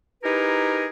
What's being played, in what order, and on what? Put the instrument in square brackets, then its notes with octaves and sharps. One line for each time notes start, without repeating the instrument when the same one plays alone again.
[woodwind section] D#4 E4 G4 G#4 A#4 B4